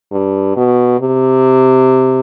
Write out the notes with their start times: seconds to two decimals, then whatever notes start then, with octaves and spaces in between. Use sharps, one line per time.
0.12 G2
0.56 B2
1.01 C3